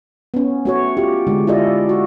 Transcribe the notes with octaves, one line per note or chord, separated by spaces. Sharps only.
B3 C#4
A3 F#4 C#5
F4 G4
D3 G#3
E4 F4 G4 A4 D5 D#5
F#4